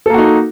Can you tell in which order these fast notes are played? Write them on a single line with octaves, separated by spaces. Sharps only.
A4 A#3 F#4 D#4